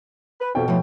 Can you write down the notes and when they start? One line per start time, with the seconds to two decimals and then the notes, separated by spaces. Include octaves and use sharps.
0.40 B4
0.55 F2 B2 G5
0.68 A2 F3 G3 A3